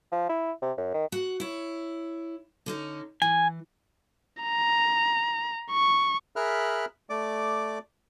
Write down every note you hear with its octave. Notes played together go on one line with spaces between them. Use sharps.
F3
E4
C3
F#2
D#3
F#4 F#5
E4 C#5
D3 C#4 D#4
E3 G#5
A#5
C#6
G#4 A#4 E5 B5 F6 F#6
A3 D5 D6